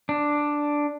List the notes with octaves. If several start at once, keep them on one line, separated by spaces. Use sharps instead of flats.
D4